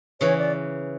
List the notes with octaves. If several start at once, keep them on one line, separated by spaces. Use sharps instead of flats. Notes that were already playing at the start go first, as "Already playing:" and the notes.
C#3 E3 C#5
D5